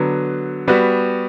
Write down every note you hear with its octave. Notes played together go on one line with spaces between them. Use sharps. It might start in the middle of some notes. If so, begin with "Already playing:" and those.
Already playing: D3 F#3 B3
G3 B3 F#4